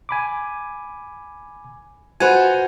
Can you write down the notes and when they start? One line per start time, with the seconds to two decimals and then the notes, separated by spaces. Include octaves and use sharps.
0.09 G#5 B5 D6
2.20 F4 F#4 B4 C5 F#5 G#5